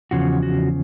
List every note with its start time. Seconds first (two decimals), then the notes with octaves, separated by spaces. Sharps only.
0.11 E2 C#3 F3 F#4
0.43 F#4